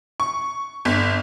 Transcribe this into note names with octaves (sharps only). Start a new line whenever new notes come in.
C#6
G1